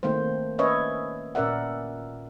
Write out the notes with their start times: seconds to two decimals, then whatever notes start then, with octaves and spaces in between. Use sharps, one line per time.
0.03 D#3 A3 A#3 C4 C5
0.58 A#3 C#4 B4 C#5 D#5 E5
1.35 A#2 C#4 A#4 D5 E5 F#5